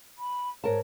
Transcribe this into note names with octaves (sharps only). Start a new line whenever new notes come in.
B5
G#2 A#4 C#5 A5